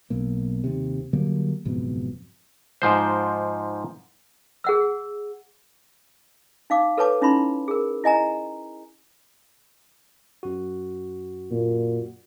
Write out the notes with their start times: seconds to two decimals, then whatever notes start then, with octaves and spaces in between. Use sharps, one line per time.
0.10 B1 A#3
0.64 D#2 C3
1.13 D3 F#3 G3 A#3
1.65 F#1 F2 G#2 B2
2.82 G#2 F3 C5
4.64 G#4 F#5 E6
6.70 D#4 F5 D6
6.97 A4 B4 C#5 A5 D6
7.21 C#4 D#4 E4 B5 C6
7.68 G#4 A#4
8.04 E4 D#5 G#5 A#5
10.43 F#2 F#4
11.51 A#2